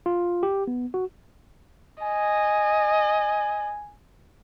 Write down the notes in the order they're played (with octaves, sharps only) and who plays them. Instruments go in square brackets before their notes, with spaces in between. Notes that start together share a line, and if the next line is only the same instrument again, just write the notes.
[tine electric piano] F4
G4
B3
F#4
[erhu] D#5 [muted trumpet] G#5